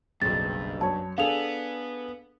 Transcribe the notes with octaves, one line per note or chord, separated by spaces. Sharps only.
F#1 B1 G2 A6
F#2 C#5 A5
B3 D4 G#4 A4 F5 F7